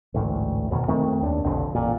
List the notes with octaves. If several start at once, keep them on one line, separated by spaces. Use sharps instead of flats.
A1 D2 G#2
F2 B2 D#3
F2 D#3 A3 C4
D#2 D4
F1 B1 F2 D3
A1 A#2